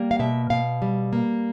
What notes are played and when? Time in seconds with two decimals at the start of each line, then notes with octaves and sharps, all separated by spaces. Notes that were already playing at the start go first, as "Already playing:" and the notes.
Already playing: G3 A#3
0.11 F5
0.19 B2 E5
0.50 B2 F5
0.82 G3
1.13 A#3